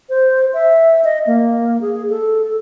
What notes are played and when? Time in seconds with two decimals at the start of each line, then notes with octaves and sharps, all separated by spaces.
0.09 C5
0.54 E5
1.04 D#5
1.27 A#3
1.81 G#4
2.10 A4